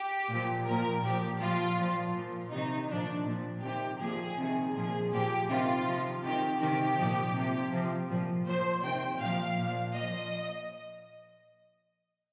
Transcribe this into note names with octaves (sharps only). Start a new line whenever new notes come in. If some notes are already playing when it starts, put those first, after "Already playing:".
Already playing: G4
A#2 F3
A#2 F3 A#4
A#2 F3 G4
A#2 F3 F4
A#2 F3
A#2 F3
C3 D#3 D#4
A#2 F3 D4
A#2 F3
C3 D#3 G4
A#2 F3 G#4
C3 D#3
A#2 F3 G#4
A#2 F3 G4
C3 D#3 F4
C3 F3
C3 D#3 G4
C3 D#3 G4
A#2 F3
C3 F3
C3 F3
A#2 F3
A#2 F3 C5
C3 D#3 G5
A#2 F3 F5
A#2 F3
A#2 F3 D#5